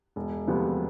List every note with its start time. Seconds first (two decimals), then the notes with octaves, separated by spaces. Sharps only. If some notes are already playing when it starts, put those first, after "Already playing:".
0.16 E1
0.47 D2 C3 F3 B3